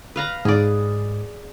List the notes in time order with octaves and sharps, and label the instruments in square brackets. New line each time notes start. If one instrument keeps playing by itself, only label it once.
[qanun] B4 F5 A#5
[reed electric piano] G#2 [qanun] G#4 D5